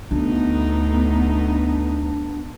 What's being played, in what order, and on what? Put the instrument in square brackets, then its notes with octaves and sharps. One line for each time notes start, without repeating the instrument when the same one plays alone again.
[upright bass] D2 [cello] A2 D#4 [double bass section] B3 [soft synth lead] D4